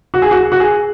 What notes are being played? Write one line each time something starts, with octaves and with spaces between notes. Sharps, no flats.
F#4
G#4
F#4
F#4
G#4